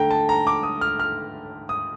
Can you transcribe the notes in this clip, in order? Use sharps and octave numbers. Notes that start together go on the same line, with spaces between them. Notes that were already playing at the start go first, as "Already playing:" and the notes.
Already playing: D3 A3 G5 A#5
A5
A#5
D6
D#6
F6
F6
D#6